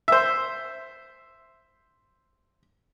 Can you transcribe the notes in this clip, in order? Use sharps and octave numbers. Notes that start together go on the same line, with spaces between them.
C5 E5